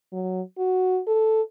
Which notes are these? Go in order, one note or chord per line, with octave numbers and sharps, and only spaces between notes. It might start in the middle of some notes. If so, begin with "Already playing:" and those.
F#3
F#4
A4